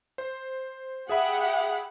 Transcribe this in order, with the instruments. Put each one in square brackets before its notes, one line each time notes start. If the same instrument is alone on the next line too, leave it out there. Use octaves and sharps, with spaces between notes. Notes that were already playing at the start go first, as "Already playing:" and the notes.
[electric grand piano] C5
[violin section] G4 F#5 [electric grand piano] G#4 E5 B5